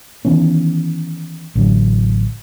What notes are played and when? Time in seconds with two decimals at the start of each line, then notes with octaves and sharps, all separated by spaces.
0.25 D#3 E3 B3 C#4
1.55 A1 D3 F#3